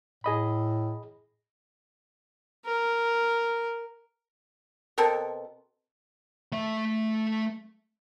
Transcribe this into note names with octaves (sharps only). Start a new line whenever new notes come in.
A2 G#4 D#5 B5
A#4
B2 C4 A4 A#4
A3 E5